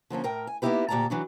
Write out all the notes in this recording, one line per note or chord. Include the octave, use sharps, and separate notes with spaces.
D3 F3 A#3 C#4
A2 A#4 G5
G#5
A#3 B3 D#4 E4 G4 B4
D2 A#2 G4 D5 A5 A#5
E3 F#3 D4